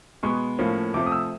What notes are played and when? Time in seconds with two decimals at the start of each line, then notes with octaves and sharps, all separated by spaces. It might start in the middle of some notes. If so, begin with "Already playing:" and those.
0.23 B2 G#3 B3 C#6
0.59 A2 F3 A#3 C#4
0.94 C3 F3 A3 C4 D6
1.06 D#6
1.12 E6